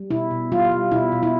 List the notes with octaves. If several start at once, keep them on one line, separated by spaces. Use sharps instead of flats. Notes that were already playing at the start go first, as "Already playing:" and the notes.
Already playing: G3
B2 E4
B2
G3 F4
G3
B2 E4
B2
E4